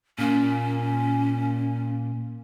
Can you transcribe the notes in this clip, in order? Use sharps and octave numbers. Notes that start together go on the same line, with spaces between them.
A#2 A#3 C#4